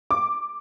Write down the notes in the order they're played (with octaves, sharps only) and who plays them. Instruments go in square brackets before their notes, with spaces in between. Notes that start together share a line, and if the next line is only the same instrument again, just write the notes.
[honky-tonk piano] D6